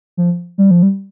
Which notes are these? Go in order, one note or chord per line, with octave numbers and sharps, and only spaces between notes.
F3
G3
F3
G3